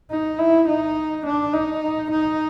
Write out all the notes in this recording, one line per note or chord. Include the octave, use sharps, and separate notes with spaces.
D#4
E4
D#4
D4
D#4
D#4